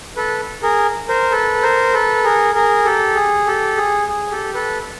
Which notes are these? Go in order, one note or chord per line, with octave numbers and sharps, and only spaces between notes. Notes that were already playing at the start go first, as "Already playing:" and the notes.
A4 B4
G#4 A#4
A#4 C5
A4 B4
A#4 C5
A4 B4
G#4 A#4
G#4 A#4
G4 A4
G#4
G4 A4
G#4
G#4
G4 A4
A4 B4